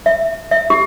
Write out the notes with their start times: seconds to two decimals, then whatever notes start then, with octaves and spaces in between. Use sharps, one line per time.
0.06 E5
0.51 E5
0.70 G4